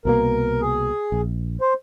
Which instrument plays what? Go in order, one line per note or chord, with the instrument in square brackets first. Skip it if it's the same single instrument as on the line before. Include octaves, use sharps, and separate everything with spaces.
[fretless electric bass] C2 B2 A#3 [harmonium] A#4
[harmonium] G#4
[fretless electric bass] A#1
[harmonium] C5